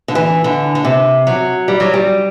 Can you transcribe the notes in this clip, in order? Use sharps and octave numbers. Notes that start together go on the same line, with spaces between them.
D3
E3
D3
D3
C3
F#3
G3
F#3
G3